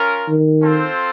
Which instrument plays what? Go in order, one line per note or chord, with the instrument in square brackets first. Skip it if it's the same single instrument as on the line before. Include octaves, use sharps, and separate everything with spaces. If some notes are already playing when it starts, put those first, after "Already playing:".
Already playing: [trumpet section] C#4 F4 A#4
[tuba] D#3
[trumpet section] C4 F4 A4 C5